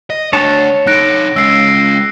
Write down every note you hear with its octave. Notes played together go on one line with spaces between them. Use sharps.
D#5
A3 D4 C#5 A5
D#4 A4 F#6 A#6 D7
G#3 C#4 E6 C7